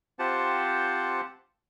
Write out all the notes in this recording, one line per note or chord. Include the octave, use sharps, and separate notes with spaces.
C4 F4 G4 C5 F#5 A5